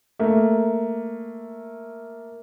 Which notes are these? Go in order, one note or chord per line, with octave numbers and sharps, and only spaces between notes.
A3 A#3